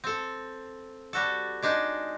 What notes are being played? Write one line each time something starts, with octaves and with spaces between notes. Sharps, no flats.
C4 A4
G3 F#4 A4
G#3 D4 D#4